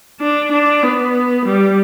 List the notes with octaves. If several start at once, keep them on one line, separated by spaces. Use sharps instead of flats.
D4
D4
B3
G3